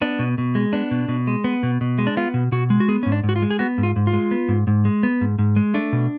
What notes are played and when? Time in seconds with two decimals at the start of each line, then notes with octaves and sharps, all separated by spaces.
0.02 B3 D4
0.19 B2
0.38 B2
0.55 G#3
0.73 B3 D4
0.91 B2
1.08 B2
1.27 G#3
1.44 B3
1.63 B2
1.81 B2
1.98 G#3
2.07 D4
2.17 B3 F4
2.34 B2
2.52 B2 F#4
2.70 G#3
2.80 F#4
2.88 B3 G#4
3.03 G#2 C#4
3.12 D4
3.23 G#2
3.29 F#4
3.36 F4
3.42 G#3
3.50 G#4
3.59 B3 F#4
3.78 G#2
3.83 F4
3.96 G#2
4.07 F4
4.13 G#3
4.31 B3
4.48 G#2
4.67 G#2
4.85 G#3
5.03 B3
5.21 G#2
5.39 G#2
5.56 G#3
5.74 A3 D4
5.93 B2